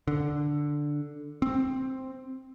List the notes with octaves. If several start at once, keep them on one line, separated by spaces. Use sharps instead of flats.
D3
C4